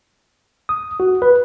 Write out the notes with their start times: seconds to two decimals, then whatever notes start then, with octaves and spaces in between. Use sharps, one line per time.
0.69 D#6
1.00 F#4
1.22 B4